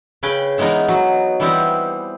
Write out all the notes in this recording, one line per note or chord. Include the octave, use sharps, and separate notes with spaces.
C#3 C#4 B4 G5
E3 G#3 B3 D#4 A#4
F#3
E3 G3 B3 C4 G4